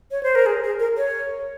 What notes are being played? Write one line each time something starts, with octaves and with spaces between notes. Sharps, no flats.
C#5
C5
A#4
G#4
G#4
A#4
C#5